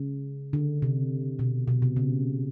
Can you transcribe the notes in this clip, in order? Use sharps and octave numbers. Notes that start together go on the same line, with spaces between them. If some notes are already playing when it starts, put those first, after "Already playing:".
Already playing: C#3
D3
C3
B2
B2
C3
C#3